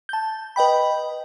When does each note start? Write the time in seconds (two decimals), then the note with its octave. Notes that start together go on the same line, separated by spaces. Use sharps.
0.09 A5 G6
0.56 B4 D#5 G5 B5